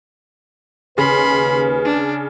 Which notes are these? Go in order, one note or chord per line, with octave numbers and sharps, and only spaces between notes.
D#2 C#3 B4 B5 C6
D4